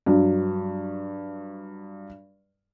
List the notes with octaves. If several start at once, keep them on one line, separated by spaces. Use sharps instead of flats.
G2 F#3